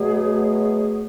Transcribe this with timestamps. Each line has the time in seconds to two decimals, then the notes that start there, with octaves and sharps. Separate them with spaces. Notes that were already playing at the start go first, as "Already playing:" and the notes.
Already playing: B2 F#3 A3 G#4